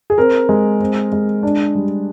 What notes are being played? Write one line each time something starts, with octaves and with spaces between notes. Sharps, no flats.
G#4
C4 A#4
G#3
C4
G#3
D4
G3